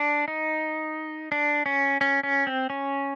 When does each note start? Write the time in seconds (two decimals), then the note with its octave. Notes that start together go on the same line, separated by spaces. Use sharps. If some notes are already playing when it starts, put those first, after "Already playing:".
Already playing: D4
0.28 D#4
1.32 D4
1.66 C#4
2.01 C#4
2.23 C#4
2.47 C4
2.70 C#4